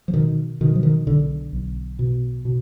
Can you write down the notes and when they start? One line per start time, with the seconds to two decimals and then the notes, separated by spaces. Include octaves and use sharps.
0.08 F3
0.13 B2 D#3
0.61 B2 D#3
0.75 F3
0.83 D#3
1.07 B1 D3
1.53 B1
1.99 B2
2.45 B2